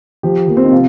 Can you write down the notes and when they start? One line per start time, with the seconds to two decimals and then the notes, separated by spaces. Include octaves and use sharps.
0.23 F3 G4
0.48 F3 A#3
0.57 C4
0.64 D#4
0.72 C3 F4